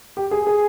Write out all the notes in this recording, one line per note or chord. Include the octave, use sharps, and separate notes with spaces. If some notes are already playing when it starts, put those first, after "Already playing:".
G4
G#4
G#4